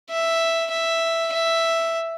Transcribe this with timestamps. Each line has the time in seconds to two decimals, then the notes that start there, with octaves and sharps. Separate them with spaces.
0.10 E5
0.71 E5
1.33 E5